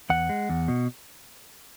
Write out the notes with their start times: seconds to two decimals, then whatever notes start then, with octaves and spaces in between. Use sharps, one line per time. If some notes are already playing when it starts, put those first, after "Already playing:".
0.10 E2 F#5
0.29 G#3
0.49 E2
0.68 B2